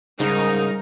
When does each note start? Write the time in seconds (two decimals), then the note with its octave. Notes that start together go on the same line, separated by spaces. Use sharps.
0.20 G#2 C#3 G3 D#4 A#4